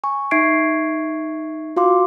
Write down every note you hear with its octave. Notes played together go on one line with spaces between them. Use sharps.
G#5 C#6
D#4 E5 C#6 G#6 C7 D7
F4 F#4 F5 C6 D6